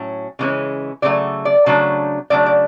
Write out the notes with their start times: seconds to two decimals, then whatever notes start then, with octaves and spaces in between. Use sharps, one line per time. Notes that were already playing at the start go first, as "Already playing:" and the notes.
Already playing: A2 F#3 C#4
0.39 C#3 E3 G#3 C#4
1.02 C#3 F#3 A3 D5
1.45 D5
1.66 C#3 F#3 A3 D4
2.30 C#3 F#3 A3 D4 D5
2.46 D5